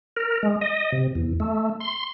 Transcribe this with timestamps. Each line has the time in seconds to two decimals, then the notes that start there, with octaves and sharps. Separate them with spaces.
0.17 A#4
0.43 G#3
0.61 D#5
0.92 C3
1.15 E2
1.40 A3
1.80 C6